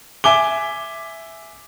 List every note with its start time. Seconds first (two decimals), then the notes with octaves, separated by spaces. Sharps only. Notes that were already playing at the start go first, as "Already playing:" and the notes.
0.24 E5 G#5 D6 G7